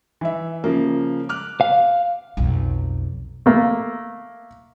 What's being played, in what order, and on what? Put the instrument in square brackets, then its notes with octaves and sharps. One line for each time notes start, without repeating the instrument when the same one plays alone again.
[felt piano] E3 E5
C#3 F3 A#3
D6 F6 F#6
[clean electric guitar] F5
[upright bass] B1 F2
[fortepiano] A3 A#3